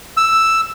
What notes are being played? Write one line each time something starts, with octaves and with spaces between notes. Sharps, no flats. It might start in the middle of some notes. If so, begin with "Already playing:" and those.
E6